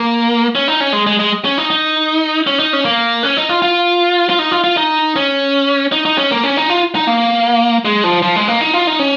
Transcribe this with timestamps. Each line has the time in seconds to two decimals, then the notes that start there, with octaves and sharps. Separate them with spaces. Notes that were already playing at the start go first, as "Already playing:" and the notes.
Already playing: A#3
0.55 C#4
0.68 D#4
0.80 C#4
0.93 G#3
1.07 G#3
1.19 G#3
1.45 C#4
1.58 D#4
1.70 D#4
2.47 C#4
2.59 D#4
2.73 C#4
2.85 A#3
3.23 C#4
3.37 D#4
3.49 F4
3.62 F4
4.30 F4
4.39 D#4
4.52 F4
4.64 F4
4.77 D#4
5.16 C#4
5.92 D#4
6.05 D#4
6.18 C#4
6.31 A#3
6.43 C#4
6.57 D#4
6.70 F4
6.95 D#4
7.07 A#3
7.85 G#3
8.04 F3
8.22 F3
8.36 G#3
8.48 A#3
8.61 D#4
8.74 F4
8.87 D#4
8.99 C#4